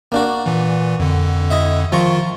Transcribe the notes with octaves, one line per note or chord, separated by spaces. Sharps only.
A#3 D4 F#4
A#2 E3
F2 D3
E4 D#5 E5
D#3 F3 F4 A#5 C#6